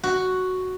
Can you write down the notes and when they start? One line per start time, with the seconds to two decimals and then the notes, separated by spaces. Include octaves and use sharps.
0.04 F#4